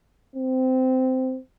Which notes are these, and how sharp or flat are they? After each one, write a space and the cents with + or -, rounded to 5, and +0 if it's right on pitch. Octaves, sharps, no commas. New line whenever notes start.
C4 -15